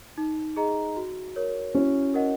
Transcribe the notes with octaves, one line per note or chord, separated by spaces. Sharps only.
D#4
G#4 D#5 A#5
F#4
A#4 C#5
C#4 E4 F#4
A#4 D#5 F#5